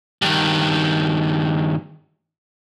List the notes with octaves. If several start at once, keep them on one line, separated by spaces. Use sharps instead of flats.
G2 D#3